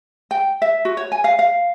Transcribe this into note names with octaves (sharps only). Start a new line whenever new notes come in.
G5
E5
F#4
C#5
G#5
F5
F5